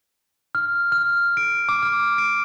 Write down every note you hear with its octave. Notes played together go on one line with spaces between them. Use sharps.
F6
F6
D7
D6
F6
D7